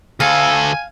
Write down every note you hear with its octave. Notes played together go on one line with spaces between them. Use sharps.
D2 A4 F5 G#5